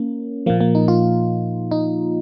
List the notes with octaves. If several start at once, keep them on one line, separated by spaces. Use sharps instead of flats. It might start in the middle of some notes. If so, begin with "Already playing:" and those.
Already playing: A#3 C#4
A#2 F3 A#3
A#3
D#4
F4
D#4